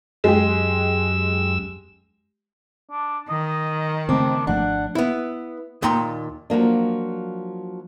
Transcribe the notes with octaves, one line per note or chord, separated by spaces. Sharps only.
F#2 G#3 G4 E6
D4
D#3 D#5
C#3 A3 C4 D4
G#1 F3 A3 D4 F#5
B3 E4
D#2 A#2 D#4 G5 A#5 C6
F3 F#3 A#3 D4